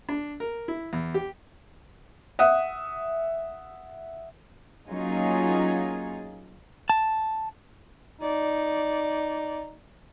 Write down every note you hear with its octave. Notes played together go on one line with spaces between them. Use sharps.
D4
A#4
E4
E2
G4
E5 F#5 D#6
F#3 A#3 C#4 D#4 F4 G#4
A5
D#4 D5